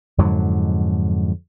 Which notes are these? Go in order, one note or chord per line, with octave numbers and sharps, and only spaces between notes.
F2 G#2 D3 F#3